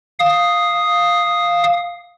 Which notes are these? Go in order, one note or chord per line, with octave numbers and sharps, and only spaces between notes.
F5 D#6